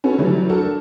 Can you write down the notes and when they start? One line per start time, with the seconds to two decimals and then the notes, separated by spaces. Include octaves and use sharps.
0.04 C#4 F#4 A4 B4
0.18 E3 F#3 G3 A3
0.49 D4 F#4 A4 A#4